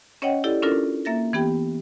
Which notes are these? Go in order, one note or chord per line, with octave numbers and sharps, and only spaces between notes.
C#4 C#5 D#5 F#5 G5
E4 G4 A4 D5
C#4 D4 E4 F4 A4 A#4
A#3 E5 A6 A#6
E3 B3 G4 G5